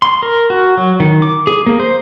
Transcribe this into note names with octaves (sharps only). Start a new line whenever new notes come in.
C6
A#4
F#4
F#3
D#3
D6
G#4
A#3
C5